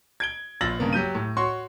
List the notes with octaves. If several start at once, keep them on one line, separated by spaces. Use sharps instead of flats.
G#6 D7 G7
A#1 F4 E6 A6 A#6 F#7
G2 C#3 A#3 B3
F#3 G4 G6 D#7
A2
F#4 C#5 C6 C#6